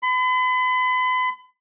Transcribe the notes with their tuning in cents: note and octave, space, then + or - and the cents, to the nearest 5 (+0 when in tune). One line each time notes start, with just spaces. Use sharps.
B5 +40